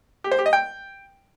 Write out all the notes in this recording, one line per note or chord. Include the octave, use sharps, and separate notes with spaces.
G4
C5
G4
D#5
G5